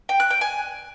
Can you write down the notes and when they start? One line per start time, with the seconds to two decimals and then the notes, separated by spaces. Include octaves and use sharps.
0.09 G5
0.20 F#6
0.30 G5
0.41 G#5